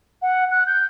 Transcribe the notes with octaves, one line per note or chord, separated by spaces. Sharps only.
F#5
F#6
G6